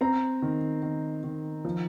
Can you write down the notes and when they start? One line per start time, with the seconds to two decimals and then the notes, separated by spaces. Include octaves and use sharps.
0.01 C4 A#5
0.42 D#3
0.82 D#3
1.24 D#3
1.65 F3